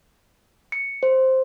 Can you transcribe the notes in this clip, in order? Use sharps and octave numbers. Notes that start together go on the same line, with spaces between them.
C#7
C5